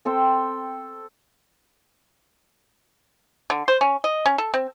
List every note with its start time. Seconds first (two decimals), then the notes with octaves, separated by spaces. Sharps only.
0.05 C4 A4 C5 G5
3.50 D3
3.68 C5
3.81 C#4
4.04 D#5
4.26 C#4
4.38 A4
4.54 C4